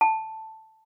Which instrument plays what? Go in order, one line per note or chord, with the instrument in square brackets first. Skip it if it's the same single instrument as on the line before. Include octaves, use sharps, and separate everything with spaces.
[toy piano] A5